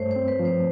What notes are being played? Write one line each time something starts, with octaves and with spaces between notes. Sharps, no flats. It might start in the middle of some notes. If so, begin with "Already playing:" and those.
Already playing: G2 A3 C5 C#5
C5
C4
B4
F3
C5